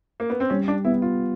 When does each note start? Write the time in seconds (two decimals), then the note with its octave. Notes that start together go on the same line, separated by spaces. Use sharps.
0.20 A#3
0.30 B3
0.40 C4
0.50 G3 C#4
0.68 D4
0.85 B3 E4
1.02 F4